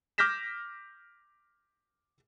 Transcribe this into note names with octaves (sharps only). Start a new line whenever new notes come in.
D6 F6 G6 A#6 B6 E7